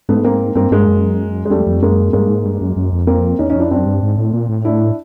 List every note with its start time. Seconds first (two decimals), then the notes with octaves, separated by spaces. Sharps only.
0.09 G#2 A3 B3
0.24 A#3 C4
0.55 G2 A#3 C4
0.71 G2 G#3 A#3
0.88 F#2
1.45 G#3
1.50 F2 G3 A3
1.67 F2
1.82 F#2 G#3 A#3
2.13 G2 G#3 A#3
2.29 G#2
2.45 G2
2.61 F#2
2.76 F#2
2.92 F2
3.07 A#3 C4
3.39 E2 C#4 D#4
3.50 C#4 D#4
3.56 F2 D4 E4
3.70 F#2 C4 D4
3.86 G2
4.02 G#2
4.18 A2
4.33 A#2
4.49 A2
4.65 D4 E4